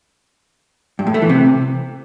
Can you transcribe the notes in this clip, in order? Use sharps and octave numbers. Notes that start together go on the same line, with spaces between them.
G2
A2
A3
E3
C3